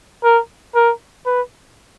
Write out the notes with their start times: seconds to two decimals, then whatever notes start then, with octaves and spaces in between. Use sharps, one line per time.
0.24 A#4
0.75 A#4
1.26 B4